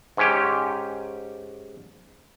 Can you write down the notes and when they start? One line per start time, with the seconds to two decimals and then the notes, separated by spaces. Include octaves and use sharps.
0.17 G#2 C#4 G4